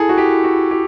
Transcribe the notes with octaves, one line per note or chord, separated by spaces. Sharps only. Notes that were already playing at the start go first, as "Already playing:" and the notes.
Already playing: E4 G#4 A4
F#4
G4
F#4
G4